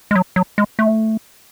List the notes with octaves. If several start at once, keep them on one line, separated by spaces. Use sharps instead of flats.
G#3
F#3
F#3
G#3
A3